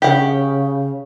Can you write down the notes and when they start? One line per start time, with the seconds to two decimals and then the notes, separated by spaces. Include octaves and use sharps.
0.02 C#3 G4 F#5